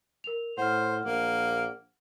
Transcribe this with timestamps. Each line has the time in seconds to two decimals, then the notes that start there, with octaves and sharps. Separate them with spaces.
0.24 A#4 F7
0.57 A2 C5 F#5 F6
1.05 A#1 A#3